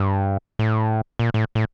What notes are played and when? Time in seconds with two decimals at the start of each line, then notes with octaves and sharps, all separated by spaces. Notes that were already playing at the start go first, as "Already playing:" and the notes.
Already playing: G2
0.59 A2
1.19 A#2
1.34 A2
1.55 A2